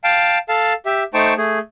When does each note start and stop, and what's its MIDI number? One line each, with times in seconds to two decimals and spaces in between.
0.04 0.38 77
0.04 0.38 79
0.04 0.38 81
0.49 0.73 69
0.49 0.73 77
0.49 0.73 81
0.86 1.03 67
0.86 1.03 76
1.14 1.34 57
1.14 1.34 63
1.14 1.34 72
1.14 1.34 79
1.14 1.34 81
1.14 1.34 85
1.37 1.59 57
1.37 1.59 68